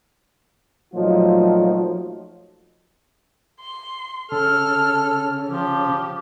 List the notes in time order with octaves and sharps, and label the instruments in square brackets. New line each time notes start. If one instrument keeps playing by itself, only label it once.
[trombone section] A#2 F3 F#3 A3 D#4 F4
[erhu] C6
[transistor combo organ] C#3 [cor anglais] A4 [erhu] F6
[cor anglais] F3 [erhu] G4